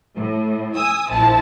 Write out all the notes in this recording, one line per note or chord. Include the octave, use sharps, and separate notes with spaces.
A2
G#5 D#6 E6
A#1 F3 E4 A5